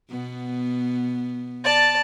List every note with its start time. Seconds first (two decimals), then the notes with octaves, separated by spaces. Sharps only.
0.10 B2 B3
1.64 D5 A5